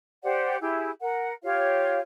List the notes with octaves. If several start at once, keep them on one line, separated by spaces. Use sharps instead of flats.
G4 C5 D5 F#5
E4 G4 G#4
A#4 F#5
F4 G4 C#5 F5